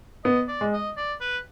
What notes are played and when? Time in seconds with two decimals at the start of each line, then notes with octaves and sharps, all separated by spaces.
0.24 B3 D#5
0.48 D5
0.61 G#3
0.73 D#5
0.97 D5
1.21 B4